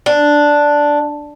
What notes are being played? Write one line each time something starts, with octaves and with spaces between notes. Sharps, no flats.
D4